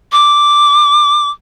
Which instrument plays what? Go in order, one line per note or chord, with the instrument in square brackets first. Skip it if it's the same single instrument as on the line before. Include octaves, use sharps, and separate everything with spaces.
[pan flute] D6